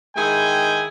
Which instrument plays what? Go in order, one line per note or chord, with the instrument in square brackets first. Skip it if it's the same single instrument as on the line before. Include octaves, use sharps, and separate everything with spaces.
[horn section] D#3 G#3 E4 G#4 G5 G#5